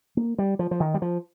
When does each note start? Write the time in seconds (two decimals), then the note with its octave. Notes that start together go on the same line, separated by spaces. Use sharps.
0.17 A#3
0.38 G3
0.59 F3
0.71 F3
0.80 D#3
0.94 G3
1.02 F3